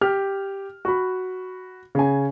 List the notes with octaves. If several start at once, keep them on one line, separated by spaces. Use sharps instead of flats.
G4 F6
F#4 B5
C#3 G#5